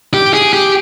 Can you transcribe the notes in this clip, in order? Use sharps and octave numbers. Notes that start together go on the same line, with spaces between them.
G4
G#4
G4